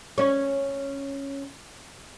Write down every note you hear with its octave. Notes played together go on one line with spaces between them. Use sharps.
C#4 C#5